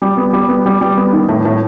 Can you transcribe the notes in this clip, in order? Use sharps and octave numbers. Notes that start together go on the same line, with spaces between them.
G3
B3
G3
B3
G3
G3
B3
D#3
A2
A2